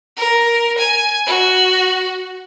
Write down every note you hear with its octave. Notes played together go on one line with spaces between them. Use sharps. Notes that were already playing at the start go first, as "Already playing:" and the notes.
A#4
G#5
F#4